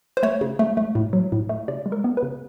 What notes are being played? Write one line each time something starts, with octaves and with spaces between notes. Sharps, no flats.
C5
A3 C#5
C#3
A3
A3
A2
F#3
A2
A3
C#3 D5
G#3
A#4
B3
B4
C#3